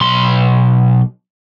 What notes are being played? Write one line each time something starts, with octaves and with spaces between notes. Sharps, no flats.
B1 C6